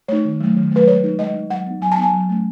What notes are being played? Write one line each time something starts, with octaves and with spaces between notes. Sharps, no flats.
A3 D#4 C#5
D#3
F#3 A3
D#3
F#3 A3 B4
G#3 C#5
D#4
G#3 D#5
D#4
F#3 F#5
B3 D#4
F#3 G#5
A5
B3 D#4 G#5
F#3
A3 C#4